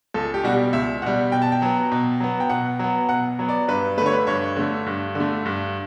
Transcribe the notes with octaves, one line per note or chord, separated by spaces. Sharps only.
C#2 A4
G4
B2 G3 F#4
G4
C#2 E5
B2 G3 F#5
B2 G5
A5
G5
F#3 B3
B2
F#3 B3
G5
B2 F#5
F#3 B3
B2 F#5
F#3 B3
D5
G2 B4
D3 A3 B4 C#5
B4
G2 C#5
D3 A3
G2
D3
A3
G2